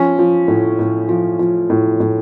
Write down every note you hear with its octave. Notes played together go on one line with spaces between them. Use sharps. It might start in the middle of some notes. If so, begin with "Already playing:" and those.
Already playing: F3 C#4
F3
A2
A2
F3
F3
A2
A2